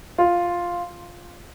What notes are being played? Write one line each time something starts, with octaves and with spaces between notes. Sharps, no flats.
F4